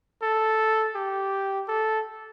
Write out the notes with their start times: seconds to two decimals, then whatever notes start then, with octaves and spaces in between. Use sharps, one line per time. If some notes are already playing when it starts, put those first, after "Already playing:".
0.22 A4
0.95 G4
1.68 A4